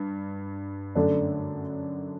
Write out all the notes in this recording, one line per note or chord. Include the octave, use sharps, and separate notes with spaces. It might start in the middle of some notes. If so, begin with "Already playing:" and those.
Already playing: G2
F#2 D3 A3 D4